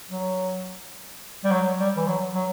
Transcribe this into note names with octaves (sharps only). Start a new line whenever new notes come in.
F#3
G3
F#3
G3
E3
F#3
F#3